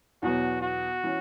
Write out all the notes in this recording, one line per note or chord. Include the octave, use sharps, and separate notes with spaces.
E2 B2 F#3 B3 F#4
F#4
E3 C#4